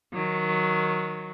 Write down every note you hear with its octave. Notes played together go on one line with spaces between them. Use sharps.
D#3 F#3